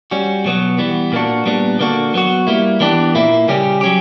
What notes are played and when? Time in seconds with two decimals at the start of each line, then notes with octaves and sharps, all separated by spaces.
0.11 G3 C#4 F#4
0.45 B2 F#3 B3 F#4
0.78 E3 G3 B3
1.12 A#2 A#3 D4 F#4
1.46 A#2 G3 B3 D4
1.79 D3 A#3 D4 F#4
2.14 F#3 B3 F#4
2.47 G3 A#3 E4
2.80 E3 B3 D4 G4
3.15 A#2 A#3 E4
3.48 C#3 G3 C#4 G4
3.81 F#3 C#4 G4